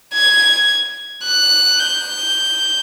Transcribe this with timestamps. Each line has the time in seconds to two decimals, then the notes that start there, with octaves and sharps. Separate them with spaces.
0.14 G#6
1.25 F#6
1.80 G6